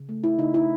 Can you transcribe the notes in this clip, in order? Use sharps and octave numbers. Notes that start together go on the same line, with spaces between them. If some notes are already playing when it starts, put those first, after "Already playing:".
Already playing: C#3
A3
E4
C#3 D#4
E4